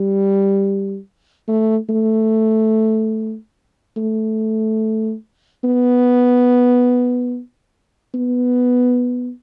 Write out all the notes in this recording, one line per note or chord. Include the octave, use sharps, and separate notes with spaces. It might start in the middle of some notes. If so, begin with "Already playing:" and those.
Already playing: G3
A3
A3
A3
B3
B3